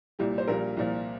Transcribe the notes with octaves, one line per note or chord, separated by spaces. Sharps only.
C2 A#2 G3 G4
C5
A#1 A#2 G3 A#4
C2 A#2 F3